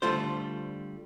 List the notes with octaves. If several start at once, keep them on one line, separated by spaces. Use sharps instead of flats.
D3 G3 A3 F4 C5